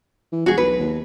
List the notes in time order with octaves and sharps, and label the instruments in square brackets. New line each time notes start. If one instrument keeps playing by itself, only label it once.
[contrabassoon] E3
[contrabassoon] E1 [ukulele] F#4 G#4
[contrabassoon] B1 [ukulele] B4
[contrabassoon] D#2